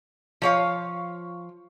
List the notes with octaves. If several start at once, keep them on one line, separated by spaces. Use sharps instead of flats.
F3 C#5 F5